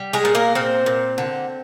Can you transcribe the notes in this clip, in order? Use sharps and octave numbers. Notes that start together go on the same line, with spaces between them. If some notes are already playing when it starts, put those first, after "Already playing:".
Already playing: G3
G#3 G#4
A#2
A#3 A#4
A#2 C4 C5
A#2
D3